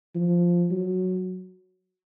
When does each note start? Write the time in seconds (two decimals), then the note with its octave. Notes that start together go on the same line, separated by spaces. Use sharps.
0.15 F3
0.71 F#3